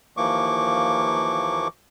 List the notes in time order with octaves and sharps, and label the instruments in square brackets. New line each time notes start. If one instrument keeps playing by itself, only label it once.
[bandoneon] D#2 E3 F3 A#3 C#6 D6